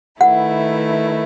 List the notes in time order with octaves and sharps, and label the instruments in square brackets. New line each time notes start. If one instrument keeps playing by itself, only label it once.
[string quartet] D#3 A3 E4 B4 [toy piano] F#5